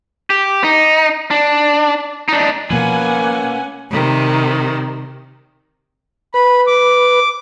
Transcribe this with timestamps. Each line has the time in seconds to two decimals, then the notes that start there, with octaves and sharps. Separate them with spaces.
0.30 G4
0.64 D#4
1.31 D4
2.29 D4 D#4
2.70 B2 F3 A#3 C#4 B4 F#5 G#5
3.89 C3 D#3 G3
6.34 B4 B5
6.67 D6